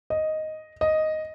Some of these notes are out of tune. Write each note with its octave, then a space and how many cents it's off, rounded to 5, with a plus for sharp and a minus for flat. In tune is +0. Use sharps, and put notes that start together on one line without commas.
D#5 +0
D#5 +0